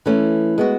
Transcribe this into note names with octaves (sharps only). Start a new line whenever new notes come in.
E3 A3 C#4
G#3 B3 F#4